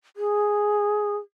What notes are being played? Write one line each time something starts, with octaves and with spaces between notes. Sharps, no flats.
G#4